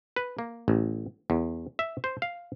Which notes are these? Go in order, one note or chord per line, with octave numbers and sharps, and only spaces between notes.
B4
A#3
A1
E2
E5
C5
F5